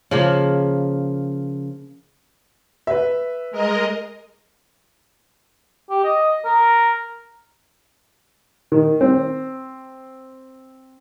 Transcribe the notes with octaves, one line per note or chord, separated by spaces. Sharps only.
C#3 F3 A#3
B4 E5
G#3 A#4 D#5
G4
D#5
A#4
D#3
C4